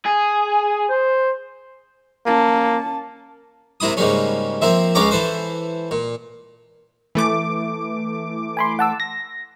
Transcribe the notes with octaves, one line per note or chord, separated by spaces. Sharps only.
G#4
C5
A#3 C#4 A5
C3 A#3 E4 B5 D#6
G#2 C#3 G3 A#3 C#4
F3 A#3 C4 E5
C#2 G#3 C#4 F5 A#5 D6
E3 A4 B4 C5
A#2
E3 A3 D6
G#5 B5 C6
F#5 A5 E6
A#6